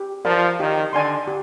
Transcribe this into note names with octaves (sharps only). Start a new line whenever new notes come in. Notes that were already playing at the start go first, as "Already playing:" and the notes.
Already playing: G4
F3 A#4 D5 F5
D#3 G4
D3 D5 G#5 C6
G4